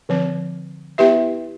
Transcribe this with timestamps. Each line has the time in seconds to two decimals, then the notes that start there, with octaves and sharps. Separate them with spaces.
0.09 D3 F3 C4
0.98 B3 E4 G4 B4 E5